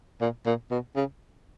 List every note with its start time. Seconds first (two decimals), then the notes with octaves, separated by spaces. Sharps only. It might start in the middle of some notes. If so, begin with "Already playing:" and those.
0.21 A#2
0.46 A#2
0.71 B2
0.96 C#3